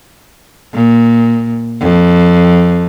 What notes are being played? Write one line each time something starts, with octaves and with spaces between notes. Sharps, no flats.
A#2
F2